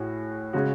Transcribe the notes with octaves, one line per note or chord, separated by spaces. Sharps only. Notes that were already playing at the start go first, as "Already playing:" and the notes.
Already playing: A2 F#4 G#4
C#3 G#3 C#4 F#4